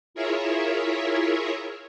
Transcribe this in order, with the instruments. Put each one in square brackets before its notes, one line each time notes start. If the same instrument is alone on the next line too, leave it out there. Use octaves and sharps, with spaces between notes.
[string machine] E4 F4 G#4 A#4 C#5 E5